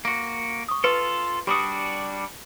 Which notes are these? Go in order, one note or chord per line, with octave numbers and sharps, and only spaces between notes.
A#3 F#4
C#6 D#6
F4 A4 B4
G3 D4 F#4 G4 D#6